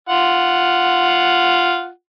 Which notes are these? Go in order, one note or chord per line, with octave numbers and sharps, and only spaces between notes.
F4 F#5